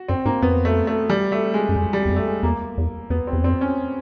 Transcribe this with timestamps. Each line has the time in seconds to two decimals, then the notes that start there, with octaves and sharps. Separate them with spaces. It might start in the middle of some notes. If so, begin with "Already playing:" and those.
Already playing: F#4
0.08 F#2 C4
0.25 G#2 A#3
0.42 F2 B3
0.65 A3
0.87 A3
1.09 G3
1.32 A3
1.54 G#3
1.69 F#2
1.76 F2 G#3
1.93 G3
2.05 E2
2.09 F2
2.16 A3
2.27 G#3
2.43 E2 A#3
2.78 E2
3.10 E2 B3
3.27 C4
3.33 E2
3.44 F2 C4
3.61 C#4